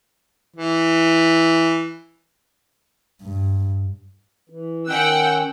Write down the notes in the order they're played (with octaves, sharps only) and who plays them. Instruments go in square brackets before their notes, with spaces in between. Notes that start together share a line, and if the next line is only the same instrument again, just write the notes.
[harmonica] E3
[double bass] G2
[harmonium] E3
[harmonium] D#3 C#4 [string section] F#5 G5 E6 [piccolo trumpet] F#6